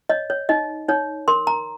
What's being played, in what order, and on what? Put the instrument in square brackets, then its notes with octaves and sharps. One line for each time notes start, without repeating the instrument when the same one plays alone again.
[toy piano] C#5 D#5
C#5
D#4 D#5
D#4 C#5
A#4 C6
A#5